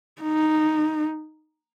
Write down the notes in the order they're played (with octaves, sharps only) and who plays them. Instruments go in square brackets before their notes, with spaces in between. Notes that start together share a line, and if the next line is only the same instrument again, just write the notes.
[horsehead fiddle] D#4